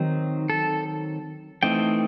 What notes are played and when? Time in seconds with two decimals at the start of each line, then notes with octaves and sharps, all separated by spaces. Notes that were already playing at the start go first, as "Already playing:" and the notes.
Already playing: D#3 F#3 C4 D#4
0.50 A4
1.63 E3 A3 C4 D#4 G5